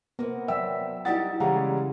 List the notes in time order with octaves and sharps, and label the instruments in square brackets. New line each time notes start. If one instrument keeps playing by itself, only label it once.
[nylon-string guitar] C3 A#3 [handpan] B3
[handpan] F#3 E5 [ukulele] D5 G5 [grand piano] E6
[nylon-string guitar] G3 E4 G4 [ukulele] D#4 F#5 [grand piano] A6
[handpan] C#3 [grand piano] E3 G3 G#3 [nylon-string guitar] C#4 [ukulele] F5 F#5 A#5